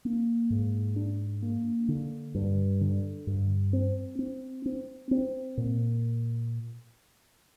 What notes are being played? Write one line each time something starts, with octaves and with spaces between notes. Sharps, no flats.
A#3
G#2
D4
A#3
D3
G2
D3
G2
C4
C4
C4
C4
A#2